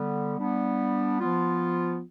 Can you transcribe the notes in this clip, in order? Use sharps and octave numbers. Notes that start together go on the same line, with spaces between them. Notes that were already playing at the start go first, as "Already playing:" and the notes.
Already playing: D3 G3 B3
G3 B3 D4
F3 B3 F4